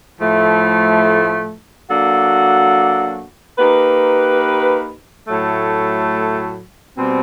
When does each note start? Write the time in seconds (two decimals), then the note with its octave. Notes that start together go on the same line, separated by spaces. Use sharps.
0.20 A2 F3 A3
1.89 F#3 A#3 D4 F#4 A4
3.58 A#3 D#4 G4 B4
5.28 A2 F#3 A3
6.97 B2 G3 C4